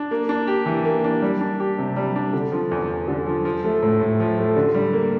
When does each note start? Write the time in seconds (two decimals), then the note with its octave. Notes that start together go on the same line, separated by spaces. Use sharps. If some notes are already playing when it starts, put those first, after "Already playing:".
Already playing: D4
0.11 A#3
0.29 D4
0.47 G4
0.66 E3
0.85 A#3
1.04 D4
1.22 G3
1.41 D4
1.60 G4
1.78 C3
1.96 G3
2.16 D4
2.33 D3
2.52 F3
2.71 E2
2.90 E2
3.08 D3
3.27 F3
3.45 F3
3.64 A3
3.82 A2
4.01 A2
4.20 F3
4.38 A3
4.56 D3
4.75 G3
4.93 A#3